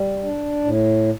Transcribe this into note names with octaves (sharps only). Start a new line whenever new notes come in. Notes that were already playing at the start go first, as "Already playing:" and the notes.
Already playing: G3
D4
A2